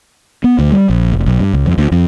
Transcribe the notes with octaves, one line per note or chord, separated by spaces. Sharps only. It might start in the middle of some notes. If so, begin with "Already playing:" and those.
B3
D2
G3
A#1
F1
B1
G2
C#2
F2
D2
F2